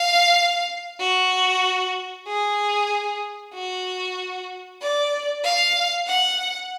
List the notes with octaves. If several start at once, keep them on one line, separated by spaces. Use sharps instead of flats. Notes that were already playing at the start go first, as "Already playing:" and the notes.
Already playing: F5
F#4
G#4
F#4
D5
F5
F#5